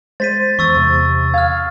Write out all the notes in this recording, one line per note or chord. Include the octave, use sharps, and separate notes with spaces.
G#3 C5 A6 B6 D#7
E2 C#6 E6 A6
C3
F5 F6 G#6